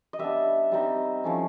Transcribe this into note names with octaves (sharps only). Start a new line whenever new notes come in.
D#5
G3 B3 D4 E5
G3 C4 D#4
F3 A3 C#4 E4